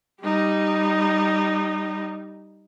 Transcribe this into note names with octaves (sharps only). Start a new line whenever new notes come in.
G3 D#4